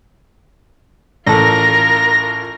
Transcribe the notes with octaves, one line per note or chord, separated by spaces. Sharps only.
A1 F4 A4 A#4 A#6